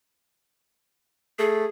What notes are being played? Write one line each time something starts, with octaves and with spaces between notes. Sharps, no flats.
A3 G#4